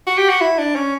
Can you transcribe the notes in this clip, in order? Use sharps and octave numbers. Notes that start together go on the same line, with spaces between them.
F#4
G4
F#4
E4
D4
C#4